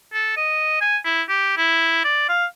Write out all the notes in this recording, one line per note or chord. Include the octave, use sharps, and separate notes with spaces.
A4
D#5
G#5
E4
G4
E4
D5
F5